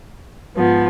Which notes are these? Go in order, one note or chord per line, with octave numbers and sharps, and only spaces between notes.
G#2 F3 B3